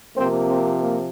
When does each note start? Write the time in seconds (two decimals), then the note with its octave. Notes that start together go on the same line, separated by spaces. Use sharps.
0.16 C3 F3 A#3 C4
0.47 C4
0.78 A#3